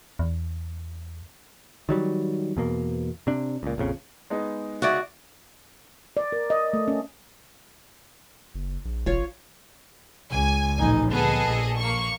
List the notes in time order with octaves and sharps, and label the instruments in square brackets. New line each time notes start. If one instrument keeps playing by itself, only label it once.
[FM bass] E2
[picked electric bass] D#3 F#3 G3
E2 B2 A#3
C3 D4
C#2 A#2
A#1 F2 C#3
[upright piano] G#3 B3 D#4
[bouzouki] C#3 A3 G#4 [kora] F#4 D5
[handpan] D5
A#4
D#5
A3
C#4
[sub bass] F#1
A#1
[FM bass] E1 [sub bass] A1 [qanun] F4 C#5
[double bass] C#2 [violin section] G#5
[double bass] A1 D#4 [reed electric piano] A#2 F3
[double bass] D2 B3 [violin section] G#4 A4 D#5
[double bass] A#1
[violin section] A#3 C#6